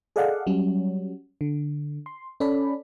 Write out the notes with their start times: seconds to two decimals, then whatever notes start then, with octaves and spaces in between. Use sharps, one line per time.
0.16 G#4 A4 D5 D#5 F5 F#5
0.47 F#3 G3 C#4 F#4
1.41 D3
2.06 C6
2.40 C#4 A4 D5 B5